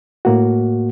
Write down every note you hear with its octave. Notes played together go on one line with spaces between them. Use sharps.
A2 A#3 F#4